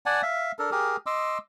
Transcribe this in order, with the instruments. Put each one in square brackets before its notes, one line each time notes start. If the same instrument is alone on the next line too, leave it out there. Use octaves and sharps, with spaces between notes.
[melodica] D5 F#5 G#5 A5
E5 F5
D4 A4 A#4
G4 G#4 A#4
D#5 C6 D6 E6